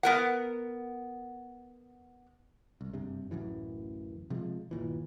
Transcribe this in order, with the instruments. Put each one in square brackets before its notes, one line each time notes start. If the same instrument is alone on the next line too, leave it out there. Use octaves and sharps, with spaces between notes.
[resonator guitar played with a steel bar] B3 A#4 F#5
[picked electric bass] C2
F#1 G2 C3
D1 A1 F#2 E3
C3 F3 G#3
G1 D#2 A#2 E3